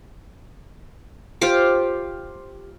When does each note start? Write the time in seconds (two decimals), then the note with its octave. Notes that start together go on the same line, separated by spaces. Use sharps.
1.41 F4 G4 C5 D6